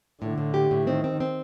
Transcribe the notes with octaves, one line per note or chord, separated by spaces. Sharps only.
A2 D3
A2
G4
A2
D#3 C4
C4
C4